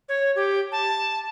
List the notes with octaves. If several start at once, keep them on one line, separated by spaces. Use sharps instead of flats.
C#5
G4
A5